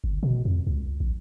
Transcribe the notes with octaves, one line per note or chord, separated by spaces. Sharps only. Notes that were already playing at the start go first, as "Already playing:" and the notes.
G1
B2
F2
C#2
A#1